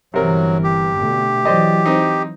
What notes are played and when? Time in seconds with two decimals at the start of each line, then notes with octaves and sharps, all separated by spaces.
0.14 G1 C3 E3 F#3 A#4
0.64 G4
0.97 B2 D3 A3
1.45 E3 F#3 C5 D5 D#5
1.86 C4 D#4